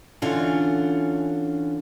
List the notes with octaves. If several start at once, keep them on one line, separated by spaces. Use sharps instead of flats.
D3 E3 C#4 D4 F4